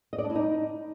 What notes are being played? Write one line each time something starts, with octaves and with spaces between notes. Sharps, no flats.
D#5
D5
D4
E4
D#4